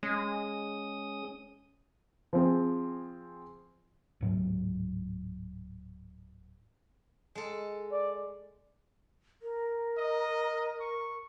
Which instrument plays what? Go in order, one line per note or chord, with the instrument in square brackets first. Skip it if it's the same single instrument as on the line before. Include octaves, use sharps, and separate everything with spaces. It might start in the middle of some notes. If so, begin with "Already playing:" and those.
[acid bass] G#3 [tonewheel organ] C#4 D#6
[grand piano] F3 C4 G#4
[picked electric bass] D1 G#2 F#3
[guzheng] G#3 A4
[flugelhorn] D5
[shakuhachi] A#4
[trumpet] D#5
C#6